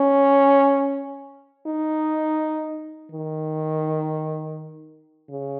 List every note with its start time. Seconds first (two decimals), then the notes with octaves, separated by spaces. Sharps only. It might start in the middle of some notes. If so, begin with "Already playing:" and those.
Already playing: C#4
1.67 D#4
3.12 D#3
5.29 C#3